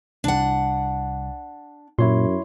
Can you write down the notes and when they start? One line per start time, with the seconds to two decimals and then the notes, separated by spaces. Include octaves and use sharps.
0.24 C2 D4 F#5
1.99 F#2 A#2 E4 C#5 C6